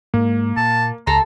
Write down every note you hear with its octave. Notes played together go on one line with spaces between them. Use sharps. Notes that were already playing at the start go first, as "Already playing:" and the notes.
G#2 G#3 A#3
A#2 A5
C#2 A4 A5 A#5 C6